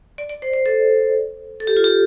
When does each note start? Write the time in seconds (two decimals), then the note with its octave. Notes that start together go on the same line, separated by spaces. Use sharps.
0.18 D5
0.29 D5
0.42 C5
0.53 C5
0.66 A4
1.60 A4
1.67 G4
1.77 F4
1.84 G4